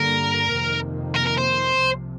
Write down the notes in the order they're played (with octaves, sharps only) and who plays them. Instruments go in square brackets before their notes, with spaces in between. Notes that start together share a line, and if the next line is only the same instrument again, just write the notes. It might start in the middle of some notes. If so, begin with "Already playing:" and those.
Already playing: [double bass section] G2 D3 G3 A#3 [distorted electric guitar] A#4
[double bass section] F2 C3 D#3 A#3
[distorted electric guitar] A#4
A#4
C5
[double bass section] C2 C3 F3